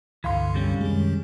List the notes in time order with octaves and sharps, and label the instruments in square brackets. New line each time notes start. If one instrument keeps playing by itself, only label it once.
[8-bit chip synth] C#2 G2 D3 [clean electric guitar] E3 C6 [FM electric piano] F5 B5
[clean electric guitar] C3 G3 C#4
[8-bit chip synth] F#2 D#3 [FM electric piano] G#3